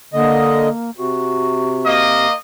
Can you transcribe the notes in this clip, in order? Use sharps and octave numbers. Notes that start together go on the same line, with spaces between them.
D3 A#3 D#5
C3 F#4
A#3 D#5